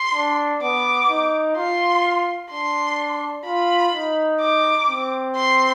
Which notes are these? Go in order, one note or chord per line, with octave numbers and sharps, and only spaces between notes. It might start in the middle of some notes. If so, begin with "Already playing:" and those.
Already playing: C6
D4
B3 D6
D#4
F4 C6
D4 C6
F4 B5
D#4
D6
C4
C6